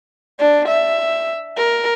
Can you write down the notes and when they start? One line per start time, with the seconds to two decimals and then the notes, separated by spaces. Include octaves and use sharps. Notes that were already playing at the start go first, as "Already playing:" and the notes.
0.39 D4
0.68 E5
1.57 A#4